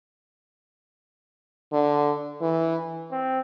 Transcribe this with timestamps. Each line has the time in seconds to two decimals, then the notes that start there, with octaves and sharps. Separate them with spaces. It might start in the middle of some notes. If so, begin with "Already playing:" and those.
1.72 D3
2.41 E3
3.12 C4